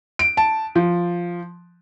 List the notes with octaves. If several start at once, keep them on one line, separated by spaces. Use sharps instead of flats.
D7
A5
F3